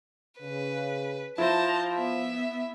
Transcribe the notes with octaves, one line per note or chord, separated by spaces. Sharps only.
C#3 B4
F3 E4 C5 A5 A#5
B3 E5